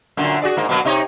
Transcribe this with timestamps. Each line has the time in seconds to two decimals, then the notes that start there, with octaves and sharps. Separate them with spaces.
0.17 F#2 A#2 D3
0.42 F#4 G#4 D5
0.57 G#2 A#3
0.69 B2 F#3 A#3
0.85 C3 D#4 C#5